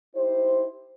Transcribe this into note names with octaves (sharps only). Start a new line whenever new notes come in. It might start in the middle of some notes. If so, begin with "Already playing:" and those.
D#4 E4 G4 C5